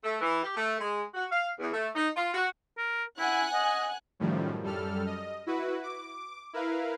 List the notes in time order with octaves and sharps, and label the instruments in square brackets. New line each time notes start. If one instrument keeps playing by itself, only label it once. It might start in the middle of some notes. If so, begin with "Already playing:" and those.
[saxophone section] A3
E3
G4
A3
G#3
F#4
F5
E2
A3
D#4
F4
F#4
[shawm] A#4
[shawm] E4 [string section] F#5 G#5 F#6
[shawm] D#5
[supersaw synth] F#2 A2 D#3 F3 G3
F#2 G3 A4 F6
D#5
E4 F#4 B4
D6
E4 A#4 B4 F5